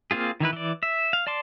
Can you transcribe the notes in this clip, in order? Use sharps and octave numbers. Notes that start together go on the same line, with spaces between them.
A#3 C4 F4 G#4
D#3 E3 E4 B4
E3 D5
E5
F5
D5 A5 C6 D6